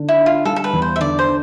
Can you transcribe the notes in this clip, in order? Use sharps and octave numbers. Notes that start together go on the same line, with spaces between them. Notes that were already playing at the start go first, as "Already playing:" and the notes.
Already playing: D3
E4
D4
F4
G3 A4
A4
B4
E2
C5
E5
D3 D5
C5
D4